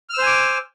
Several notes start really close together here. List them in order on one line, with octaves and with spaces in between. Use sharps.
F6 E6 C5 G#5 D6